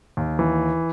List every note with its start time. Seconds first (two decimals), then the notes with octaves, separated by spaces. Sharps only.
0.17 D#2
0.39 E3